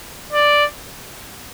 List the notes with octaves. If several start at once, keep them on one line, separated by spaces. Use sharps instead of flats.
D5